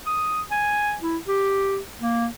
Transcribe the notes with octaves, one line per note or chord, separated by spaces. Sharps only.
D#6
G#5
E4
G4
A#3